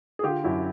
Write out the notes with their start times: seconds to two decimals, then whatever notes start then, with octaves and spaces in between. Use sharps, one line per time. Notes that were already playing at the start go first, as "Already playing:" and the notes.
0.19 G#4
0.23 D3 F4 G4
0.44 F#2 E4 F#4